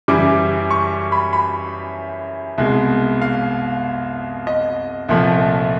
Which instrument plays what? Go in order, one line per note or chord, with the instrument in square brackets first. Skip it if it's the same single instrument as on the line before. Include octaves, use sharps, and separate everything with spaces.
[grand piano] F#2 C#3 E3 G3 D6
C#6
B5
B5
C2 B2 G#3
F5
D#5
C2 A#2 F3 A3